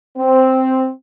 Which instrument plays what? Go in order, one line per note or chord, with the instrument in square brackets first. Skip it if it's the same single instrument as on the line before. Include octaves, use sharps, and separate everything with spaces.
[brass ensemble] C4